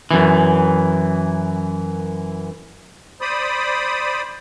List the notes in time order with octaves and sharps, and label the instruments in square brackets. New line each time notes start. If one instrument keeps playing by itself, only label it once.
[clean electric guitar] F#2 E3
[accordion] C5 D5 B5 D#6